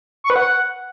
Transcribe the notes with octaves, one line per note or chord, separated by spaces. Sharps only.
C#6
B4
F#5